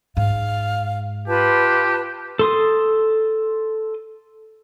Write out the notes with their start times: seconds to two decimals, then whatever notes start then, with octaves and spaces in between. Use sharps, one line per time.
0.17 G#2 F5
1.28 F4 G4 B4 A5
2.39 A4 C6 D#6